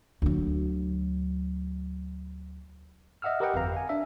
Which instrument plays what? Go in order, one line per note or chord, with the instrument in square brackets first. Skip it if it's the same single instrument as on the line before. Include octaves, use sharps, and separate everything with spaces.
[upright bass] D2 F#3
[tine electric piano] D#5 E5 F#5 E6 F6
G4 A#4 B4 D#5 F#5 G5
G1 F2 F5 A#5
F5 G#5
D4 E5